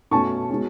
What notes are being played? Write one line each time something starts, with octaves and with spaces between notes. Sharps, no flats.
B2 A3 C#4 A5 C#6
B2 G#3 C#4